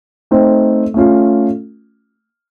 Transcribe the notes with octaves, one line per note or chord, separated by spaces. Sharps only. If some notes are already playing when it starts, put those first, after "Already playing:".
A3 C4 D#4
A3 C#4 F4